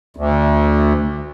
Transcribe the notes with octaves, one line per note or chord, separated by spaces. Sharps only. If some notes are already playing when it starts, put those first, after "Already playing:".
D2